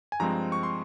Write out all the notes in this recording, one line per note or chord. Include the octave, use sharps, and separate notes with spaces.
G#5
G2 F3 G#3 C4 A#5
C#6
C6